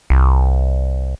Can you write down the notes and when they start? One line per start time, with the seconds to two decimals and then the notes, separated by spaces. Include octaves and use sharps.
0.10 C2